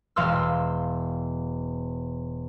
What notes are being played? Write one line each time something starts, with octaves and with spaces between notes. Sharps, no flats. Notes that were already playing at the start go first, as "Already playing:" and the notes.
E1 F5 C6 E6